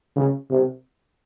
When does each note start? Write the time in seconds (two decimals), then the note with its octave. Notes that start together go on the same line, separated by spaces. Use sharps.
0.16 C#3
0.50 C3